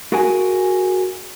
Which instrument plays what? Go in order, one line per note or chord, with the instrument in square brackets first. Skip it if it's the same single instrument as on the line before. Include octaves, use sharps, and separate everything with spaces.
[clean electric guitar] F4 F#4 G#4 A#4 F#5 G#5